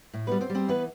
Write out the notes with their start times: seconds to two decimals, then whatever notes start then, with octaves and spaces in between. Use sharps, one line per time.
0.13 A2
0.27 G3 B3 B4
0.41 C4 C5
0.50 G3
0.55 C4 C5
0.68 E3 B3 B4